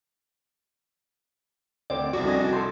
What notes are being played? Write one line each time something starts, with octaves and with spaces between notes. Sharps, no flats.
D2 C4 D5
C2 F2 F#4
D4 D#5 G#5
A4 C5